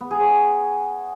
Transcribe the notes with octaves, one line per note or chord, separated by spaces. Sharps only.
B3
G#4
C#5